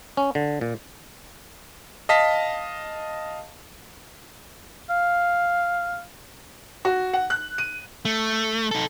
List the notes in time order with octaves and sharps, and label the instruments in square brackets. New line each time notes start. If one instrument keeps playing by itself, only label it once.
[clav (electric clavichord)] C#4
D3
A#2
[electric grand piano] D#5 F5 A5 B6
[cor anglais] F5
[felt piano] F#4
F#5
F#6
D#7
[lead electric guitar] A3
D#4 A4